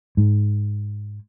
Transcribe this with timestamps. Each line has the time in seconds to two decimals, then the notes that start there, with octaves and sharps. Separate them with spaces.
0.17 G#2